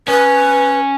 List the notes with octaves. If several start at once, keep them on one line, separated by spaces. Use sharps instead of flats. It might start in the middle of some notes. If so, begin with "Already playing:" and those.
C#4 B4